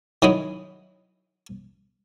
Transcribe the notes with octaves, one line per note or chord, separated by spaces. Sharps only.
D#3 F#3 D#4 E4